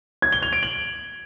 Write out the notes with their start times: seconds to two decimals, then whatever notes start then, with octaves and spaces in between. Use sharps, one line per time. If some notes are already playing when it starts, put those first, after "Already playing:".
0.22 G#6
0.32 G7
0.43 F7
0.53 D7
0.63 F#7